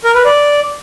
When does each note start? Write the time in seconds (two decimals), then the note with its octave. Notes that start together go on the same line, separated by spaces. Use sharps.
0.04 A#4
0.14 B4
0.25 D5